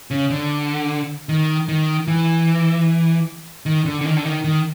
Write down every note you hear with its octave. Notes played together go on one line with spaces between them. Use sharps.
C#3
D3
D#3
D#3
E3
D#3
D3
D3
D#3
D3
D#3
D#3